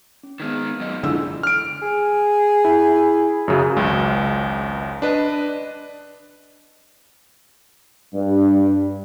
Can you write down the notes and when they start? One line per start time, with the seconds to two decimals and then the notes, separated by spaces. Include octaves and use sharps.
0.23 C#4
0.40 D#3 G#3 B3 F6 G#6
0.80 F#2 D#5
1.03 F#1 G#2 D3 G#3 E4 F4 E6
1.43 F6 D7
1.82 G#4
2.65 E4
3.48 F#2 C#3 F#3
3.76 G#1 C#2 F#2
5.02 D4 B4 D#5
8.14 G2